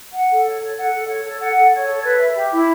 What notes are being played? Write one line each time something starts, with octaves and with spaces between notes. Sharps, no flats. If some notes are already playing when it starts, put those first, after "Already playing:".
F#5
A4
C#5
A4
F#5
A4
C#5
A4
F#5
A4
C#5
A4
B4
E5
G4
E4